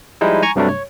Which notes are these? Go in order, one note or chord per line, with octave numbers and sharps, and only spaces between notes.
F3 G3 G#3 D#4 E4
G#5 A#5 C#6
G2 C3 F#3 G3 A3 D4
C#5